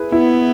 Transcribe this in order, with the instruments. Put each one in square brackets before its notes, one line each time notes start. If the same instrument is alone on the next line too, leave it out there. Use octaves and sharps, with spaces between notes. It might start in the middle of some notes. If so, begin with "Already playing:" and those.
Already playing: [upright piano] E4 G#4 B4
[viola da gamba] B3 [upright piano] E4